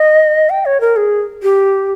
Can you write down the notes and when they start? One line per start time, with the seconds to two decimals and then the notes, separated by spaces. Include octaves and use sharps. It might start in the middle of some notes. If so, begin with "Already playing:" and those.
Already playing: D#5
0.50 G5
0.65 C#5
0.81 A#4
0.96 G#4
1.43 G4